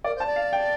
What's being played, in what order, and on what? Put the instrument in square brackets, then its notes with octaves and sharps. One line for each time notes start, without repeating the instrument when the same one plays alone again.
[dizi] A#4 [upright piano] D5
[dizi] C5
[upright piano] A5
[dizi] D5
[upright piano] F5
G5